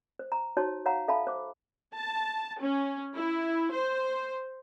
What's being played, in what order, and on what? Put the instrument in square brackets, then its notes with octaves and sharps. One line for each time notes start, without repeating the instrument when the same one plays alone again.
[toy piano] C5
A#5
D#4 F#4 C5 C#5 A5
C#5 F5 F#5 A#5
A4 E5 F5 A5 B5
C5 D6
[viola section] A5
C#4
E4
C5